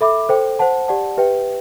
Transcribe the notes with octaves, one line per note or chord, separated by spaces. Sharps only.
A4 E5 B5 D6
A4 C5 G5
C5 F#5 A5
G4 D5 F#5 A5
G4 B4 E5 G5